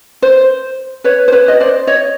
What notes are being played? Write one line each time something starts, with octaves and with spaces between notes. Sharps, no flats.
C5
B4 C#5
C5
B4 C#5
D#5
C5 D5
C#5 D#5